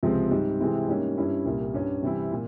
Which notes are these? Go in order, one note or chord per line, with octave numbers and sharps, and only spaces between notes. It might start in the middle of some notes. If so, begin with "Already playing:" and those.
C#2 C3 F3 G#3 C4
G#2 G3 C4
C3 E3 G#3 C4 E4
G#2 G3 A#3 C#4
G2 G3 C#4 E4
C2 A#2 G3
G2 G3 C#4
C3 E3 G3 C4 E4
A#2